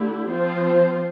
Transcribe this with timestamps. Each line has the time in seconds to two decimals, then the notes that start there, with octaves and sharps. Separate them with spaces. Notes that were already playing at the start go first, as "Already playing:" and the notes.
Already playing: D3 A3 E4 G4
0.28 F3 C4 F4 C5